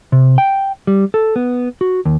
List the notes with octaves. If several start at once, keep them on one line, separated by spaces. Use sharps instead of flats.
C3
G5
G3
A4
B3
F#4
D#2